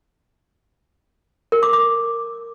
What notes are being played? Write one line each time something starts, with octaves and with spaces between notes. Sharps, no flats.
A#4
D6
D6